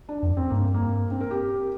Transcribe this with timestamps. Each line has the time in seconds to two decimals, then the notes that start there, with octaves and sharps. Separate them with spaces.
0.09 D4
0.23 F2
0.37 C4
0.50 G2 A#3
0.74 A#3
1.11 C4
1.21 A#4
1.31 G4